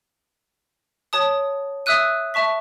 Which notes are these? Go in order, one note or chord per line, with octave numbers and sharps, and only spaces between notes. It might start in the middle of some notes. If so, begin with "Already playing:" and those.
C#5 A5 D#6
E5 D#6 E6 F#6 D#7
E5 A5 C#6 B6